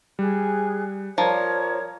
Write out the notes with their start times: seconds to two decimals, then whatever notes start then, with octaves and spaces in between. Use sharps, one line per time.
0.19 G3 G#4 F#6
1.18 F3 A#4 C#5 D5 A#5 G#6